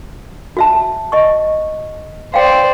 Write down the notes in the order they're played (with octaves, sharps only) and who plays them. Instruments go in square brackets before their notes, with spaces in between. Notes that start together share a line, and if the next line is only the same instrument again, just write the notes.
[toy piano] F#4 E5 A5
D#5 C#6
[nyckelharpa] C5 D5 [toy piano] F5 G5